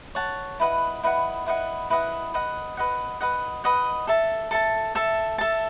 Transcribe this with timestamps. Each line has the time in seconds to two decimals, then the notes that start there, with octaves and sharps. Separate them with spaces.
0.15 C#5 F#5 A5
0.60 E4 B4 D#5 F#5
1.03 E4 B4 D#5 F#5
1.46 E4 B4 D#5 F#5
1.90 E4 B4 D#5 F#5
2.34 B4 D#5 F#5
2.77 B4 D#5 F#5
3.21 B4 D#5 F#5
3.64 B4 D#5 F#5
4.07 A4 E5 A5
4.51 A4 E5 A5
4.95 A4 E5 A5
5.38 A4 E5 A5